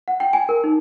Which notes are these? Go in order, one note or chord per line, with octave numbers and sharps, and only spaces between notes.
F#5
G5
G#5
A#4
D#4